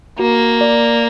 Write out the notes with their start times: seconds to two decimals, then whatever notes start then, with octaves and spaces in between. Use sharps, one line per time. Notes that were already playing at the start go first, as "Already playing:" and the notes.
0.19 A#3 F#4
0.61 D5